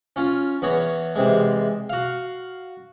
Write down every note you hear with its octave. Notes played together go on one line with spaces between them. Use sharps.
C#4 F4
E2 B3 C#5 A#5
E2 C3 G#3
F#4 F5